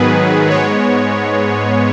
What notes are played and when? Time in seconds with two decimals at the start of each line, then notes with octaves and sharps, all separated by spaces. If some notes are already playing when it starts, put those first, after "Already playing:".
Already playing: G#2 D#3 F#3 B3 G#4 B4
0.50 G#2 G#3 B3 C#5